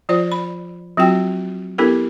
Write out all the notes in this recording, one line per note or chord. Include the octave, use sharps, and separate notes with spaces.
F3 F4 C5 D5
B5
F#3 C4 F4 F#4 G5
B3 D4 E4 G4 A4 A#4